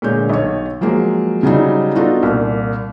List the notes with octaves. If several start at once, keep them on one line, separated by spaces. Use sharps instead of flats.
A#2 D3 G#3 C#5 G6
B1 C#5
F3 F#3 G#3 A#3
C#3 F#3 G3 D#4
B3 D4 D#4 F4 F#4 A4
C2 A#2